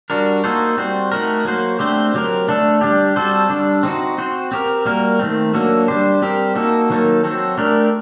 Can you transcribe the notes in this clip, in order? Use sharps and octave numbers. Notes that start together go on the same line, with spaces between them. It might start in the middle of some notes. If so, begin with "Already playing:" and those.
G3 D4 F#4 A#4
A#3 D#4 F#4 A4 C5
G3 C4 F#4 C5
A3 D#4 F#4 A#4
F#3 A#3 F#4 C5
D3 A3 C4 G4 C5
F#3 C4 G4 A#4
D3 A3 D4 A4
G3 D4 G4
G3 C4 F#4 A4 C5
D3 G3 D4
C4 D#4 F#4
C4 F#4 C5
C4 G4 A#4
G3 A#3 F#4 A#4
D#3 A3 C4
D3 F#3 A#3 F#4 A4
G3 D4 G4 C5
G3 C4 G4 A#4
A#3 D#4 F#4 A4
D#3 F#3 A#3 D#4 A4
F#3 C4 F#4 A4
A3 D4 G4 A#4